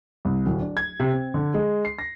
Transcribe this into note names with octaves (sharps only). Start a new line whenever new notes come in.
C2
D1
D4
G#6
C3
C4
D3
G#3
C7
A#6